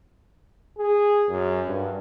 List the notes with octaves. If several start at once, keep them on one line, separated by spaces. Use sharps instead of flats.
G#4
F#2
G2